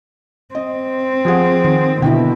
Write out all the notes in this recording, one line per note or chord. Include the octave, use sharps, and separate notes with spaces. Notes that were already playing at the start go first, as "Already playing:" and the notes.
C4 D#5
F3 G#4 F#5
D#3
B2 D3 B3 E4 G5